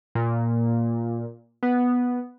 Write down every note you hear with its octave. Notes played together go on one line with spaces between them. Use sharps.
A#2
B3